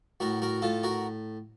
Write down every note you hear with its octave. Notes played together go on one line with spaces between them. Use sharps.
A2 F#4 A#4
F#4 A#4
A2 F4 A4
F#4 A#4